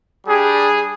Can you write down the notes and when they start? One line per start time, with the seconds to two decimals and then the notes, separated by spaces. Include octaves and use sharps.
0.27 G3 D4 G4 G#4